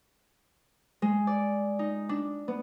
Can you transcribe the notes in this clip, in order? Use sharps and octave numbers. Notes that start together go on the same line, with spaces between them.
G#3
D5
D#4
D4
B3